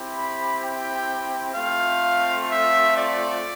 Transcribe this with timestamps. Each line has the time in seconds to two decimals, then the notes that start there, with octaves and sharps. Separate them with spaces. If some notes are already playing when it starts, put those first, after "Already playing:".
Already playing: C4 E4 G4
0.13 B5
0.60 G5
1.54 A3 C4 F4 F5
2.49 E5
2.96 D5